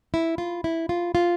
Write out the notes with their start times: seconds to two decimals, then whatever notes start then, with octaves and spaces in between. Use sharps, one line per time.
0.14 E4
0.38 F4
0.64 E4
0.89 F4
1.15 F4